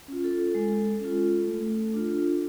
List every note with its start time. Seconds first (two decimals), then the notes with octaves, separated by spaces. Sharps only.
0.08 C#4 F4
0.24 A4
0.55 G#3
1.01 C#4 F4
1.48 A3
1.94 D4 F4